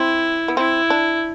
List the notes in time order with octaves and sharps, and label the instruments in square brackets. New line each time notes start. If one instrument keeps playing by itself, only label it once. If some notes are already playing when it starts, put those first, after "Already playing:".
Already playing: [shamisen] C4 [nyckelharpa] E4
[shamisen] B3
[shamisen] C4 [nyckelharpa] E4
[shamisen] D4